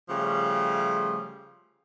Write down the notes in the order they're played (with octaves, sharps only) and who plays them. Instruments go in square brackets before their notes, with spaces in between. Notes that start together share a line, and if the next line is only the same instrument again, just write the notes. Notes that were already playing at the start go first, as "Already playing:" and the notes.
[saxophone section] C#3 F3 G3 A3